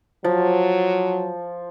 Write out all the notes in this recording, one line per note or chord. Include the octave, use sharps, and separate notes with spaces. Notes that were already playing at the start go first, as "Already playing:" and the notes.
F3 F#3